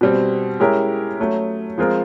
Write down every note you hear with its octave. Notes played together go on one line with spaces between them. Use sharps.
B2 G3 C4
G#3 C#4 E4 G4 A#4
F#3 A3 C#4
F3 G#3 C4 F4 A#4